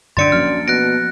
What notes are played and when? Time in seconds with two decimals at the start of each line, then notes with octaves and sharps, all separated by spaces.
0.17 F#2 D3 D4 D5 C6 A6 C#7 D7
0.32 F#2 F3 A#3 F6
0.68 B2 F#6 A#6 D7